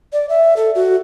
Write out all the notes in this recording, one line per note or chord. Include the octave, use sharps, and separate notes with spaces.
D5
E5
A4
F#4